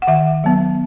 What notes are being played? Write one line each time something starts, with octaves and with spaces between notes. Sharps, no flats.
F#5
D#3 E5
F#3 B3